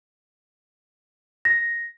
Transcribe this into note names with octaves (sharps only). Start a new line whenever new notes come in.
A#6